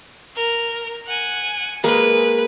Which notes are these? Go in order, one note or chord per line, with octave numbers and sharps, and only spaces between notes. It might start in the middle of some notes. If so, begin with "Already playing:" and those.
A#4
F#5 G#5
G#3 A#3 B4